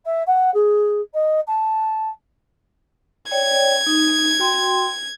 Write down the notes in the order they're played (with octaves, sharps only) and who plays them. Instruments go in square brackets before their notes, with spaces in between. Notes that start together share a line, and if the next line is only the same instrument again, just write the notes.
[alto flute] E5
F#5
G#4
D#5
A5
[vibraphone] C#5 D5 G5 [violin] G#6
[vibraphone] D#4
F#4 G5 C6